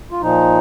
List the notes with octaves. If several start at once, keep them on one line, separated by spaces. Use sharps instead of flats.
F4
A#2 F3 D#4